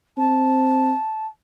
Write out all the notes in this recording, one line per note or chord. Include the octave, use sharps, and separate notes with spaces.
C4 A5